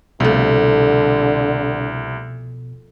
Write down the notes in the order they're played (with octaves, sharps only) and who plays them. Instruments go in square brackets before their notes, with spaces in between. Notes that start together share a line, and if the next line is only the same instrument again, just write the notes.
[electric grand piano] C2 [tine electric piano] B2 [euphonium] D3 [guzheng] F3 A3